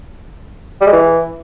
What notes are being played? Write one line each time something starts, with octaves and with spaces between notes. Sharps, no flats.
G3
G#3
E3